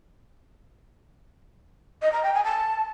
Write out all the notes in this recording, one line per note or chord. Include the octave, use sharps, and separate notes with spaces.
D#5
A#5
G5
G#5
A5